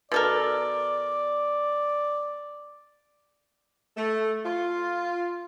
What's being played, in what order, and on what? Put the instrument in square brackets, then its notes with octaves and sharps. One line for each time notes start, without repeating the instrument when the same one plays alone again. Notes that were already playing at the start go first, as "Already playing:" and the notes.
[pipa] B2 A4 A#4 [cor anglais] D5
[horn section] A3
F4